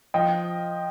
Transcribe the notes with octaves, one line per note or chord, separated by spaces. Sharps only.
F3 D#5 G5